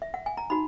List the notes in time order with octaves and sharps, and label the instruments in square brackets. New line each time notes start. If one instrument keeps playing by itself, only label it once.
[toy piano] E5
F#5
G#5
A#5
D#4 F#4 B5